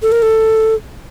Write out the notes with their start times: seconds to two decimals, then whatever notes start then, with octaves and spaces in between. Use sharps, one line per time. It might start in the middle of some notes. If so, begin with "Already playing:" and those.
0.03 A4
0.12 A#4
0.22 A4